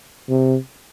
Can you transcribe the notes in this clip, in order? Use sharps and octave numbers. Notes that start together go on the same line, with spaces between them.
C3